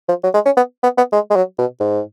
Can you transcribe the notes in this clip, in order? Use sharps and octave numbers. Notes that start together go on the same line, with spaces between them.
F3
F#3
G#3
C#4
B3
B3
B3
G#3
G#3
F#3
B2
G#2